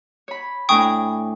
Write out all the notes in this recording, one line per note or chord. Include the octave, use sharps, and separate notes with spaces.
C#5 B5
A2 D4 G5 G#5 C#6 D#6